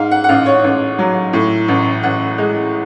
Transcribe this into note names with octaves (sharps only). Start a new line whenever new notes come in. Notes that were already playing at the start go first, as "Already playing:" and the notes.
Already playing: G#2 F5
F#5
F#5
A1 F5
C#5
A1
F#3
A2
A1
A1 F#5
G#3